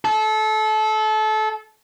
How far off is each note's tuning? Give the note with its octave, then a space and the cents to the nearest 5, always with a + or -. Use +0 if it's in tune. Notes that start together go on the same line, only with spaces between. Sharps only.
A4 -25